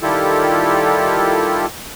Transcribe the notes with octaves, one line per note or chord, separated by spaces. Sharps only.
D#3 G3 E4 F4 G4 A4